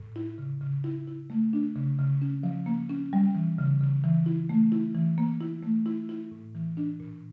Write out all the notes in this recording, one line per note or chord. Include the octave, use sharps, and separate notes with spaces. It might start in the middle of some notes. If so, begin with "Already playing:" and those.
Already playing: A2
E4
C#3
C#3
E4
E4
A3
D4
C#3
C#3
C#4
F3
A#3
C#4
G3
E3
C#3
C#3
E3
E4
A3
E4
E3
A#3
E4
A3
E4
E4
A2
E3
D4
A#2